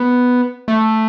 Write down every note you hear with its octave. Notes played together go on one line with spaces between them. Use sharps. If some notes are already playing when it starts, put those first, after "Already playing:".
Already playing: B3
A3